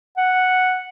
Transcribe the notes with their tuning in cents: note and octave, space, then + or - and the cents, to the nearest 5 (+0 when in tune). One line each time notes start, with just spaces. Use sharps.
F#5 -5